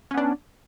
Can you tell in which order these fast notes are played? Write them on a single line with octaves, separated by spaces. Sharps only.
C#4 B3 D4